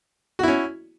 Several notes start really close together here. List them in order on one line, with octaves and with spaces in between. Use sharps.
F#4 E4 C#4